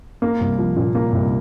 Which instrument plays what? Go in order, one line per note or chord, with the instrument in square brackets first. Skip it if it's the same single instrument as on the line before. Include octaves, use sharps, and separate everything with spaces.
[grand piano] A#3
C2
F3
A#2
A#3
C2